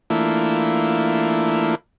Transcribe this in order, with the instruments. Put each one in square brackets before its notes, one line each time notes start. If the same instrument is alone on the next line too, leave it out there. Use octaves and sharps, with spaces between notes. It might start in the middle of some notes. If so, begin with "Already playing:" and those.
[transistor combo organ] E3 A3 A#3 D4 E4 F4